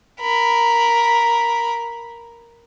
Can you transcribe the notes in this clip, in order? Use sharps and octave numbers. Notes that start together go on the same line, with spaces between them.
A#4 B5